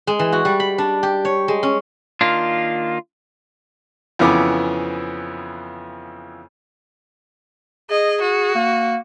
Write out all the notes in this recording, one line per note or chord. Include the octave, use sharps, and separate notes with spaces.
G#3
E3
F#4
G3
B5
D4
G4
C#5
G#3
C#4
D#3 A#3 D4 F4
F2 C#3 E3 B3 D6
G#4 D#5
F#4
A#3